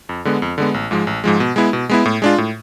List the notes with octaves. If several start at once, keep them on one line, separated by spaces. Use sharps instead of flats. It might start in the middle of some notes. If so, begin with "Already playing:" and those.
F2
D3 G#3 B3
F2
D3 G#3 B3
A1
G#2 F3 G#3
A1
G#2 F3 G#3
B2
G#3 B3 E4
B2
G#3 B3 E4
A2
G#3 D4 F4
A2